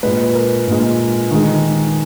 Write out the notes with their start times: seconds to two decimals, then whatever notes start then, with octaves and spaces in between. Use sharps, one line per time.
0.03 A#2 G#3 B4
0.35 A#4
0.67 A#2 G#3
1.31 D#3 G#3